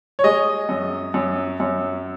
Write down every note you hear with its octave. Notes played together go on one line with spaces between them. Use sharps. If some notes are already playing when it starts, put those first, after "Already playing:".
C#5
G#3 D#5
F#2
F#2
F#2